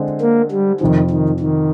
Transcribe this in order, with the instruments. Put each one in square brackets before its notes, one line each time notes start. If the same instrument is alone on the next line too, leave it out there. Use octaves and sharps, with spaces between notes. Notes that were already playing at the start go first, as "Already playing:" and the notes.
Already playing: [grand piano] D3 G#3 C4
[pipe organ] A#3
G3
[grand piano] F2 C3 F3 [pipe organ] D#3
[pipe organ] D#3
D#3